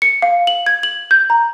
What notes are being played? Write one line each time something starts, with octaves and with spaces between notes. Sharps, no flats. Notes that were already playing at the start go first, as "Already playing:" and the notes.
C#7
F5
F#7
G#6
F#7
G6
A#5